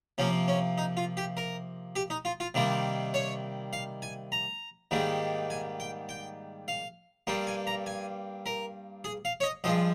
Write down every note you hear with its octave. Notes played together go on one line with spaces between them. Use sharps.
C3 F3 A#3 C#4
C#4
D#4
F4
G4
A#4
G4
D#4
F4
F4
C3 D#3 G3 A#3
C#5
F5
G#5
A#5
G#2 D#3 G3 A#3
G#5
G5
G5
F5
G2 G3 A#3 G5
G#5
A#5
G#5
A#4
G#4
F5
C#5
D#5
G2 F3 G#3 D#5